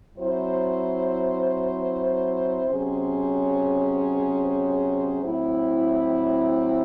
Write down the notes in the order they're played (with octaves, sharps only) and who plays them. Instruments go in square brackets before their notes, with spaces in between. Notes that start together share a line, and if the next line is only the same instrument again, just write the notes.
[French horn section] F#3 C4 E4 C5
C3 F#3 C#4 G#4 C5
A2 F#3 C4 E4